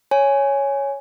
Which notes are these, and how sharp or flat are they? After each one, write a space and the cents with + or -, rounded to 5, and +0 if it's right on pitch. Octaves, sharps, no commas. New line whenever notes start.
C#5 +0 G#5 +0